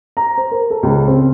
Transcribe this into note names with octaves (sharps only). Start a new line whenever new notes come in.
A#5
C5
A#4
A4
C#2
C4